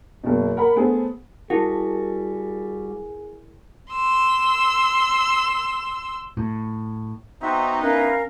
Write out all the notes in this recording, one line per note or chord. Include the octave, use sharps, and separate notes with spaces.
F#1 B2
A#4 F#5 B5
A3 B3 G#4 A4 C5
G3 E4 F#4 G#4 A#4
C6 E6
A2
B3 C4 D#4 F#4 E5
C#4 E4 A#4 B4 F5